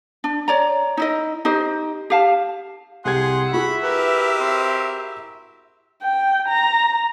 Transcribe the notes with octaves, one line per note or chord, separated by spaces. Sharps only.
D4
C#5 D5 A#5
D#4 E4 D#5
D#4 G4 C5 D#5
G4 F5 A5
C2 G4 G#4 F#5 C6 G#6
E4 F#4 G#4 E5 B5
G4 A#4 B4
C4
G5
A#5